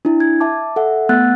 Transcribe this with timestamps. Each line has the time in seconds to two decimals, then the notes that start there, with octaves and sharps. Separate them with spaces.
0.05 D4 E4
0.20 G#6
0.40 E5 A5 D6
0.76 A4 E5 F#5
1.09 A3 B3 F#5 E6 F#6 A6